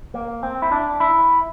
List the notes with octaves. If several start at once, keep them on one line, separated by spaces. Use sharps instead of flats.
A#3
C4
E4
D4
E4